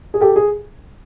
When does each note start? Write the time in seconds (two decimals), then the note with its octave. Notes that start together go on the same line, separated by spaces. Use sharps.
0.14 G#4
0.21 G4 A4
0.36 G#4